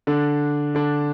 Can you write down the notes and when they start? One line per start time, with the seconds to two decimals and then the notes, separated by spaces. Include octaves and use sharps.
0.07 D3 D4
0.75 D3 D4